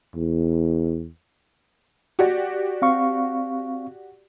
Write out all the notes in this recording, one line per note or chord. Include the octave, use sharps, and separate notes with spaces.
E2
F#4 G4 D5
C4 F5 C#6